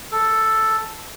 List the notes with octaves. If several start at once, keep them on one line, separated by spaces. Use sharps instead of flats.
A4